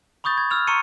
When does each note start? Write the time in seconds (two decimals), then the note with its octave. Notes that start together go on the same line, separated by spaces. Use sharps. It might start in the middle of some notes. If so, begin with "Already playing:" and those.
0.24 B5 C#6 D#6 G6 A6
0.38 G#6
0.51 E6 F6 F7
0.67 A#5 C6 C#6 C#7 D#7